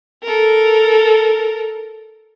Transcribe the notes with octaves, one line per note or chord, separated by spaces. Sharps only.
A4 A#4